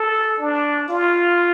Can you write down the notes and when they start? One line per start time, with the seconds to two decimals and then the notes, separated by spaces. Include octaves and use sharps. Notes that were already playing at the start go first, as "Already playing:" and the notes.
Already playing: A4
0.39 D4
0.88 F4